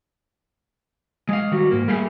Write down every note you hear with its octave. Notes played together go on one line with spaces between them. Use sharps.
G#3 F5
D#3 G3 F#4
G#2 A#3
G3 A3 A#3 G#4